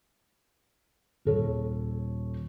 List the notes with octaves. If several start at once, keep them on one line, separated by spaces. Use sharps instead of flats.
D#1 A4 C#5